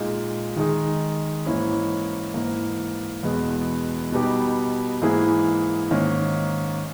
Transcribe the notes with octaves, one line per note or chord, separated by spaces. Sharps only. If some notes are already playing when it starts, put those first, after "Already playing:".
Already playing: A#2 G#3 D#4
D#3 G#3 D#4 G#4
G#2 E3 A#3 C#4 E4
G#2 E3 A#3
E2 B2 G#3 B3
B2 G3 B3 D#4 G4
G#2 E3 A#3 E4 G#4
G#2 D#3 A#3 C#4